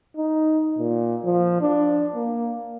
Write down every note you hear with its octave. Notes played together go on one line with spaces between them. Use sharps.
D#4
A#2
F3
D4
A#3